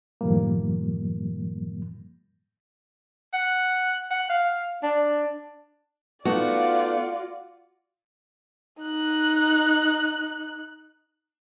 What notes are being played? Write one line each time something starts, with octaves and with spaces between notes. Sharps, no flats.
F#2 A2 D#3 F3 G3 A#3
F#5
F#5
F5
D4
A3 B3 D#4 F4 F#4 D5 F#5
D#4 F#6